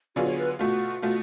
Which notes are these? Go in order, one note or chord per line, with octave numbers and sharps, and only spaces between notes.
D3 F#3 B3 F4 F#4 G#4
C#5
B4
B2 A3 F4 F#4
B2 A3 F4 F#4